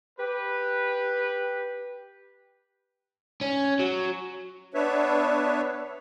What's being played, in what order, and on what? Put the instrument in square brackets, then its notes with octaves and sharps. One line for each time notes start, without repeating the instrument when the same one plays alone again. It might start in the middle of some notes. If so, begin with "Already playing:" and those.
[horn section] G4 B4
[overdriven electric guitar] C#4
F#3
[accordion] B3 D4 B4 C#5 E5